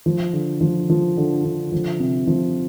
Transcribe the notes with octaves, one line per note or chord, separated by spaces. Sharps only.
F3
D3
F3
F3
D3
D3
F3
C3
F3